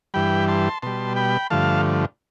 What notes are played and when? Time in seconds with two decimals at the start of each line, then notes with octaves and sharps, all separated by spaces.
0.14 G2 E3 G3 G5 B5
0.48 A5 C6
0.82 B2 G3 A5 C6
1.16 G5 B5
1.50 G2 D3 F3 A3 F5 A5